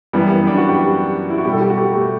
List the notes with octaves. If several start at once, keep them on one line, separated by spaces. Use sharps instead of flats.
F#2 E3 G3 B3
B3
D4
F#4
G4
E4
F#4
B2 G3 G4
A4
G4
F#4
G4
A3